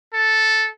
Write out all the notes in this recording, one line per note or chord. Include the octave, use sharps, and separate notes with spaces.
A4